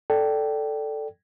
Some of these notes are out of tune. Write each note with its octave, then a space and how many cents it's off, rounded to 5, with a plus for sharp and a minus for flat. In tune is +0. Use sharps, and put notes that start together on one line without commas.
A4 +0 D5 +0 G5 -15